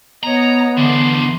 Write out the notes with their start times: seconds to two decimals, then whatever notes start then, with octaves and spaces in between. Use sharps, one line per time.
0.23 B3 C#5 D#5 A#5
0.77 D3 E3 D4 C6